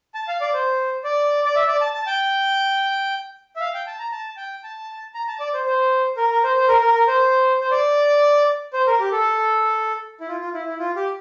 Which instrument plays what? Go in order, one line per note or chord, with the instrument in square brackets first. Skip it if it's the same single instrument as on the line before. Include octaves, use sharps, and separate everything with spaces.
[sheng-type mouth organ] A5
F5
D5
C5
D5
D5
E5
D5
A5
A5
G5
E5
F5
G5
A5
A#5
A5
G5
A5
A#5
A5
D5
C5
C5
A#4
A#4
C5
C5
A#4
A#4
A#4
C5
C5
D5
C5
A#4
G4
A4
E4
F4
F4
E4
E4
F4
G4